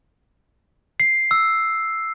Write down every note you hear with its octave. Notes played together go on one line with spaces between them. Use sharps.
C7
E6